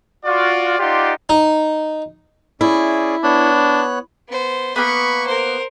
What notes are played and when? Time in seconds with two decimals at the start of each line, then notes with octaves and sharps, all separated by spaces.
0.25 F4 F#4 D5
0.79 D#4 F4 G4 D5 F#5 C6
1.29 D#4
2.61 C#4 E4 G#4 D5
3.24 B3 D4 C#5 F#6
4.29 B3 C5
4.76 A#3 B3 B5 C#6
5.26 A#4 C5